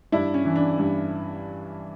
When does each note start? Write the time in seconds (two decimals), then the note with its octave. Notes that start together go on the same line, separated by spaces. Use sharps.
0.12 G2 D4 E4
0.34 C#4
0.45 E3
0.56 D4
0.78 G2